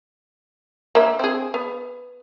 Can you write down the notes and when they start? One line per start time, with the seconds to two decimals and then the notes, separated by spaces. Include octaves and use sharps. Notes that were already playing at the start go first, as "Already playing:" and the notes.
0.95 A#3 E5
1.19 C4 G#4
1.54 B3